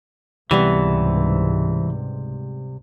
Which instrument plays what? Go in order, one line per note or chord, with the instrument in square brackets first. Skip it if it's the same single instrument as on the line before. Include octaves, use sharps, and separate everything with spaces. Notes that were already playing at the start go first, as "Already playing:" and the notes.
[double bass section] C#2 G#2 [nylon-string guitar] C3 G3 B3 [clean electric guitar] E3